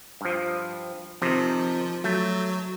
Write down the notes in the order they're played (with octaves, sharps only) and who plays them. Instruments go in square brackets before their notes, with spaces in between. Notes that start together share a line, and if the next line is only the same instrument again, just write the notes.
[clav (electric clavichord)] G2 F3
[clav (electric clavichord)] C3 D#3 [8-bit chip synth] F3
[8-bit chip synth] F#3 [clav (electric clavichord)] A3